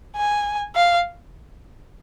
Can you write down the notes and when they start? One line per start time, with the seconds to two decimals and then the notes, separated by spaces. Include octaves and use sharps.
0.16 G#5
0.76 F5